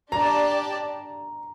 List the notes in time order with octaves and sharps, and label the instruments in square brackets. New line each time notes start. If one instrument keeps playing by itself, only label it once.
[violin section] D4 G4 D5 A5 [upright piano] A#5